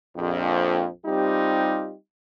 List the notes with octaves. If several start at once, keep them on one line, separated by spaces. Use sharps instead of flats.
A#1 F2
G3 C4 D#4 F4 G4